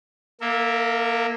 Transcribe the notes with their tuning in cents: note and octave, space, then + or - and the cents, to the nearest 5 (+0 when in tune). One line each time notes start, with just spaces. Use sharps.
A#3 +10 A#4 -45 E5 -10